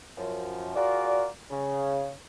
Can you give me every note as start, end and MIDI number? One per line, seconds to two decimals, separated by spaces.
0.18 0.74 42
0.18 0.74 53
0.76 1.27 65
0.76 1.27 66
0.76 1.27 68
0.76 1.27 70
0.76 1.27 74
1.51 2.12 49